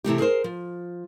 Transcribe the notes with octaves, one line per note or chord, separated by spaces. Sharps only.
C3 E3 A3 G4
G#4 A#4 C5
F3